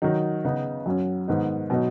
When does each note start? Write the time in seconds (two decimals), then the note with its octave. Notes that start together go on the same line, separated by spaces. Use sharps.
0.02 D#3 F#3 D#4
0.45 C#3 B3 D#4
0.86 F#2 F#3 C#4
1.28 G#2 D#3 B3 D#4
1.70 B2 F#3 B3 D#4